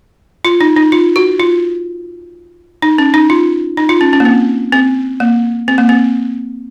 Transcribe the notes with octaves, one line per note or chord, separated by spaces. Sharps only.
F4
D#4
D#4
F4
F#4
F4
D#4
C#4
D#4
F4
D#4
F4
C#4
C#4
A#3
C4
C4
A#3
C4
A#3
C4